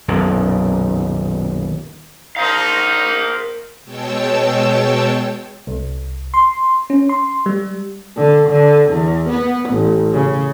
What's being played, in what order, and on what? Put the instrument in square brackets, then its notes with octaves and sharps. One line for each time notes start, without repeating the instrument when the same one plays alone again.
[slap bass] D#1 B1 F#2 D#3
[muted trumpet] D#4 [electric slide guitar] A#4 C5 F5
[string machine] B2 G#3 C#5 G5 A5 E6
[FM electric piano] C2
C6
C#4
C6
G3
[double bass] D3
D3
E2
B3
A1
C#3